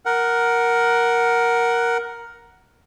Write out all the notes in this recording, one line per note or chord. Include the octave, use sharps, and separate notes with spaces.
A#4 F#5